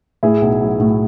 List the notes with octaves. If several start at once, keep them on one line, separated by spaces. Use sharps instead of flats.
A2 E4 G#4
B1
F#3
A2